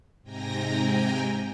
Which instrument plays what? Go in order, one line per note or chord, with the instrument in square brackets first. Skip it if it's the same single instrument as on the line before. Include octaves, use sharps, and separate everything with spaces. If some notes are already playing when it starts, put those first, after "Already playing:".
[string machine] G#2 C3 G5 G#5 A#5 A#6